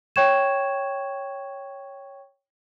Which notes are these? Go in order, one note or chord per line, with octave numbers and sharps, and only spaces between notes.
C#5 G5 C#6 G#6 E7